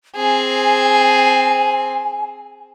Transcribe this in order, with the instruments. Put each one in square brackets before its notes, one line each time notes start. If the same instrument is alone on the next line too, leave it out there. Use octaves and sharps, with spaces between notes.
[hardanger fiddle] C4 G#4 [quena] G#5